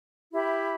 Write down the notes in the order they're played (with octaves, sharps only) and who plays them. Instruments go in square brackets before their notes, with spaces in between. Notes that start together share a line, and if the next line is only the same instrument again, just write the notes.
[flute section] E4 G4 E5 B5